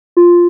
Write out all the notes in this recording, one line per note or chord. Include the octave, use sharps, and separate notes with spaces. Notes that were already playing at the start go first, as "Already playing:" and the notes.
F4